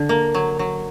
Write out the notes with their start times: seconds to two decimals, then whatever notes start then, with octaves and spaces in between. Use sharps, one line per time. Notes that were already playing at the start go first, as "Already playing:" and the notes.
Already playing: D3
0.09 A#3
0.34 F#3
0.59 F#3